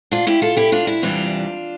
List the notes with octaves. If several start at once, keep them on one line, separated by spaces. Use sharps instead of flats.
D4 F4
E4 G4
F4 A4
E4 G4
D4 F4
E4
E2 C3 E3 G3 D4 F4